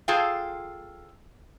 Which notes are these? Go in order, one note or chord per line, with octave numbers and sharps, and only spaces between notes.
F4 G#4 A4 F5 G5